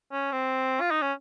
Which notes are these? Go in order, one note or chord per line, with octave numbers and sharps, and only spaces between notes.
C#4
C4
F4
D#4
C#4